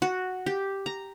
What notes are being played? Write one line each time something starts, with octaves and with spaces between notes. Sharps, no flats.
F#4
G4
A#5